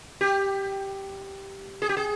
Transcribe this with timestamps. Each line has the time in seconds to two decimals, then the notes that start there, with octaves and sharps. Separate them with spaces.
0.21 G4
1.82 G#4
1.89 G4
1.97 G#4